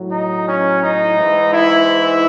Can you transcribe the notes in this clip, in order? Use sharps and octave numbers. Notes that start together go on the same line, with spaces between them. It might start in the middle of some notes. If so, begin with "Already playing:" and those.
Already playing: A2 F#3
D#4
C#4
D#4
G#2 E3
E4